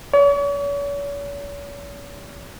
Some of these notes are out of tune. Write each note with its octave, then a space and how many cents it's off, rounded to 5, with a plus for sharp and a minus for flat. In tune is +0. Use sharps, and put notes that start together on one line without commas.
C#5 +45